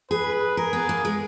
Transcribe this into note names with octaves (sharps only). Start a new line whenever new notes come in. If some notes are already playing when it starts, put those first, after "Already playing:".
G#4 B4
G#4 A#4
B3
A#3
G#3